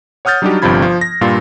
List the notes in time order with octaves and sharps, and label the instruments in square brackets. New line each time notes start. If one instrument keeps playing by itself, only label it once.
[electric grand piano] C#5 F#5 D#6 F6 G6 A6
F#3 G3 D4 D#4 F#4 G4
G1 G2 C3 F3 B5 G#6
F3
A#6
G2 A#2 G3 F4